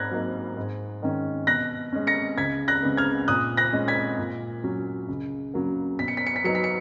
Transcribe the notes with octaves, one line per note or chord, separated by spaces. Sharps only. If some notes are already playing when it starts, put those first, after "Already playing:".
Already playing: G#2 F#6 G#6 A#6
F#3 A#3 D#4
G#2
D#3 G#3 C#4
B2 F#6 A#6
G#3 C#4
A#6 C#7
C#2 G#6 B6
F#6 A#6
C#3 G#3 B3
F6 G#6
A#2 D#6 F#6
F#6 A#6
G#3 C#4
G#6 B6
A#2
F#3 C#4
C#2
C#3 F#3 A#3
B2 B6
C#7
B6
C#7
B6
F#3 B3 D#4 C#7
B6
C#7